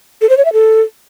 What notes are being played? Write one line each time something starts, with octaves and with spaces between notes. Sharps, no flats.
A4
C5
C#5
E5
A4